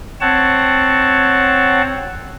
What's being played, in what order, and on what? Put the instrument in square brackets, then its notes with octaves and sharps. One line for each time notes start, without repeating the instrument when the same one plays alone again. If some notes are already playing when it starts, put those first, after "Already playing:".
[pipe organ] C4 C#5 F#5 A5